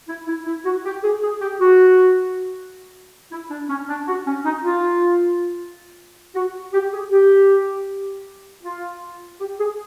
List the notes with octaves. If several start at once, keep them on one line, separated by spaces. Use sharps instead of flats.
E4
E4
E4
F#4
G4
G#4
G#4
G4
F#4
E4
D4
C#4
D4
F#4
C#4
D#4
F4
F#4
G4
G#4
G4
F4
G4
G#4